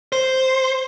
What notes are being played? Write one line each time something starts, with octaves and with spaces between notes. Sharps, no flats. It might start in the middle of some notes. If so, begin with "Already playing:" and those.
C5